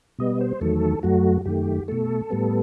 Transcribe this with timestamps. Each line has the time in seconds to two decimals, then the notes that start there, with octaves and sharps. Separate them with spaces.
0.19 B2 G3 B3 D#5
0.41 C5
0.61 E2 D#3 F#3 A3 A4
1.03 F#2 F#3 A3 F#4
1.45 F#2 D#3 A3 G4
1.88 B2 A3 A4
2.30 A2 G3 B3